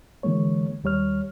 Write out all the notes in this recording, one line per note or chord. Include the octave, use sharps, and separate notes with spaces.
D3 E3 G#3 A#3 C#5
D#2 G3 C#5 F6